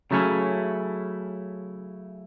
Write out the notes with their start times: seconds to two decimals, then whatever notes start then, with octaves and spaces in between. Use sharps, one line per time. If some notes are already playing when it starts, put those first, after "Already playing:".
0.11 C#3 F#3 A3 C#4 E4